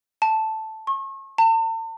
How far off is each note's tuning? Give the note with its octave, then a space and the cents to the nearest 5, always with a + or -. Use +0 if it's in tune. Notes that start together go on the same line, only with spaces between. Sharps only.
A5 +0
C#6 -40
A5 +45